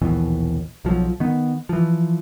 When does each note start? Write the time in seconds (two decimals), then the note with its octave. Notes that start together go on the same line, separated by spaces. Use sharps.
0.02 A#1 D#2 B2 E3
0.85 B1 F3 F#3
1.20 D#3 B3
1.69 E3 F3